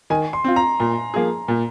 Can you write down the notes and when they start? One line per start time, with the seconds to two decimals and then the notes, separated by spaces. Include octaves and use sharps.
0.10 D#3 G#5
0.33 C6
0.44 C4 F4
0.56 A#5
0.80 A#2 C6
1.14 F3 A#3 G#4
1.48 A#2